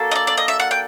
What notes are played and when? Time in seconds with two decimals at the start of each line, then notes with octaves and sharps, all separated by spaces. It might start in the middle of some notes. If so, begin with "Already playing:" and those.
Already playing: A#3 D4 F#4 A4
0.11 D#5
0.15 D5
0.27 D5
0.37 D#5
0.48 E5
0.60 F#5
0.71 G5